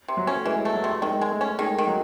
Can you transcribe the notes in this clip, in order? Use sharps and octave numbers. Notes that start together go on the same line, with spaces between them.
C3
F#3
C#4
A3
E3 G#3
A3
F#3
C3
D#3 G#3
G#3
A3
C#4
D#3 G#3
D#3
F#3